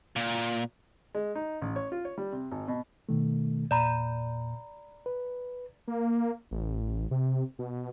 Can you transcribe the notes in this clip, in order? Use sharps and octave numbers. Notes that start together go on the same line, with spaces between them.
A#2
G#3
D#4
A1
C#5
F4
C#5
G3
C3
G#1
B2
B2 D#3 A3
E2 A#2 D5 A#5 B5
B4
A#3
A1
C3
B2